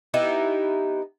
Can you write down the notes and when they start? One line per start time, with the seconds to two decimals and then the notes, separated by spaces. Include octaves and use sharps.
0.14 B3 D#4 E4 G4